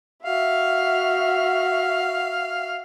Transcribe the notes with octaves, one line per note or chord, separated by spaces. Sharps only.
F#4 E5 F5